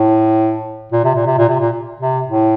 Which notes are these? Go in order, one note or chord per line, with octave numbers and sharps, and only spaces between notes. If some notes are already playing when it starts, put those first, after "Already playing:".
Already playing: A2
A#2
C3
A#2
C3
A#2
C3
A#2
C3
A2